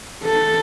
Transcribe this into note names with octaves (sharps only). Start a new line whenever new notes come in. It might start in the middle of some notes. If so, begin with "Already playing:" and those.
A4